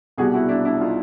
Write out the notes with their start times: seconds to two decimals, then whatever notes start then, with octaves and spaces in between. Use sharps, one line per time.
0.18 C2 B2 G3 F#4 G#4
0.34 E4 F#4
0.49 D4 E4
0.65 D4 E4
0.81 D#4 F4